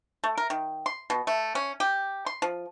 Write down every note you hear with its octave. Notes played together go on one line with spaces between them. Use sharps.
A3
A#4
D#3
C6
B2
A3
C#4
G4
C6
F3